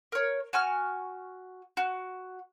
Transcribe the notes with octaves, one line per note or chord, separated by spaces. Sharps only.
A#4 C#5
F#4 G#5 C#6 F6
F#4